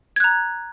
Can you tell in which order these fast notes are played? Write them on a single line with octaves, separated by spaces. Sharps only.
G#6 F#6 A#5